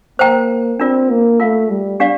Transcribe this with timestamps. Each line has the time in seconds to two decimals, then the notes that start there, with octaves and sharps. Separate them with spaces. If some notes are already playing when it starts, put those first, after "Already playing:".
0.19 A#3 C5 G5 A#5
0.80 C4 D4 F4 A#4 D5
1.10 A#3
1.40 A3 F4 A#4 F5
1.70 G3
2.00 D4 G4 D5 F5